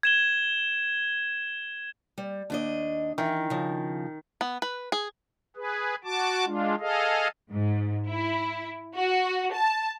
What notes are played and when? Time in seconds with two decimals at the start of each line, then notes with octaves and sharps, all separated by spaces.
0.03 G#6 E7 G7
2.18 G3
2.50 D#2 D4 D#5
3.18 D#3 E3
3.50 C#3 F3
4.41 B3
4.62 B4
4.92 G#4
5.56 G#4 B4
6.04 F#4 A5 D6
6.46 G#3 D4 F4
6.80 G#4 A4 D#5 F5
7.51 G#2
8.08 E4
8.95 F#4
9.52 A5